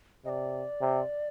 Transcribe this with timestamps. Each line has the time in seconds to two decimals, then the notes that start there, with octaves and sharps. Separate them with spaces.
0.25 C3 D5 D#5
0.81 C3